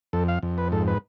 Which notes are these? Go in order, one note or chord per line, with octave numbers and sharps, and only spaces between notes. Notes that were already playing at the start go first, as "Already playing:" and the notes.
F2 A4
F5
F2
B4
G#2 A4
B4